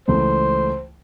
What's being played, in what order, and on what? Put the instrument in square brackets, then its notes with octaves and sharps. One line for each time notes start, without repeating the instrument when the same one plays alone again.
[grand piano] C#2 E3 A3 [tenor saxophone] C5